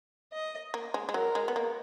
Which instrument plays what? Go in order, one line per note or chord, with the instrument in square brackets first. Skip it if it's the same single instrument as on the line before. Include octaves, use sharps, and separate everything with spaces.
[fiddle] D#5
[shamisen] A#3
G#3
G#3
[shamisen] F#3 [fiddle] A#4
[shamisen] G#3
B3
A#3